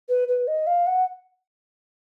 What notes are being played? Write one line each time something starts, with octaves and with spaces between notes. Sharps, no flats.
B4
B4
D#5
F5
F#5